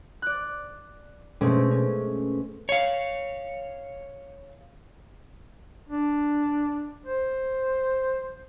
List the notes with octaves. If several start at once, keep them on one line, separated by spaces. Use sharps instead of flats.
D5 F#6
B2 G#3 A3 C4 C#4
C#4
C#5 F5
D4
C5